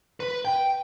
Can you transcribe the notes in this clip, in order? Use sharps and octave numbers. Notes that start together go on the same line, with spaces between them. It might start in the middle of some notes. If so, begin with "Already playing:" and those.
B4
G5